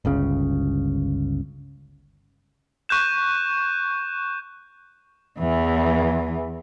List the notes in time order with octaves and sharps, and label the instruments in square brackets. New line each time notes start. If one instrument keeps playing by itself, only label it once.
[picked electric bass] G1 C#2 C#3
[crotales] C#6 F#6 G6 E7
[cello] E2 E3